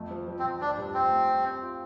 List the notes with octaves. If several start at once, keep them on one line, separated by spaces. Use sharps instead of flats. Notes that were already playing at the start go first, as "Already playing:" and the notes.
Already playing: F2 A3
F3
F3
C4
F2
F3 D4
G2
G2 C4
A3
G3
C4
F4